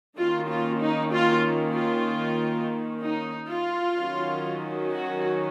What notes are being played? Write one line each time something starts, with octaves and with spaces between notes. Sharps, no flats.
D#3 A#3 C#4 F4
F4
D#4
F4
F4
D#4
F4
D#3 F#3 C#4
F#4